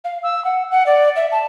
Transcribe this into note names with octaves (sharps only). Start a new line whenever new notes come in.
F5
E6
F#5
F#5
D5
E5
A5